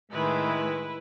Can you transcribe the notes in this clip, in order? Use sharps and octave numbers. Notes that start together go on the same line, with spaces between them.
A2 D#3 G#3 E4 B4